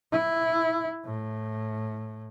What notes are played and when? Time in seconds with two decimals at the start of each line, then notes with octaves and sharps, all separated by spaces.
0.12 E4
1.05 A2